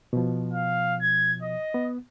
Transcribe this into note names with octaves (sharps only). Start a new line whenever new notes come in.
B2 F3
F5
G#6
D#5
B3